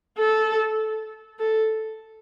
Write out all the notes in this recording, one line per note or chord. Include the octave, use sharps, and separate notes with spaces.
A4
A4